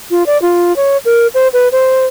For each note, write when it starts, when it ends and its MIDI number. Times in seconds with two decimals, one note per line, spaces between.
0.11 0.26 65
0.26 0.40 74
0.42 0.75 65
0.76 0.97 73
1.05 1.27 70
1.34 1.48 72
1.53 1.68 71
1.72 2.06 72